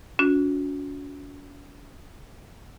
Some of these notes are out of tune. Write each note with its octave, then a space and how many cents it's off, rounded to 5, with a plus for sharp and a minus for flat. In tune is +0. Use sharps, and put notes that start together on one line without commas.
C#4 +45 F#4 -30